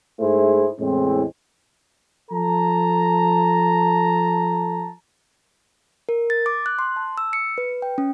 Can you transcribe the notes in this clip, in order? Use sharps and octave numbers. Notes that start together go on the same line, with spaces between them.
G#2 A3 E4 G#4 C5
E2 A2 G#3 C4
F3 A4 A5 A#5
A#4
A6
D6
F#6
C6
A5
E6
C#7
B4
G5
C#4